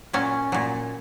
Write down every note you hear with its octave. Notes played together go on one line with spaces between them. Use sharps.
A#2 F#3 C#4
A#2 F#3